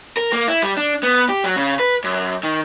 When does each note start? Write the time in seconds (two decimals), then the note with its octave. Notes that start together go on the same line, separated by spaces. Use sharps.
0.17 A#4
0.33 A#3
0.48 E4
0.62 G3
0.77 D4
1.03 B3
1.29 G4
1.44 F#3
1.56 C#3
1.79 B4
2.04 F#2
2.43 D#3